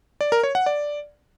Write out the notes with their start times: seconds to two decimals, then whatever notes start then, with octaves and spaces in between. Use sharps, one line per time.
0.21 D5
0.32 A#4
0.43 C#5
0.55 F#5
0.66 D5